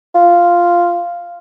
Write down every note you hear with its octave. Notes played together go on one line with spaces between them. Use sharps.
F4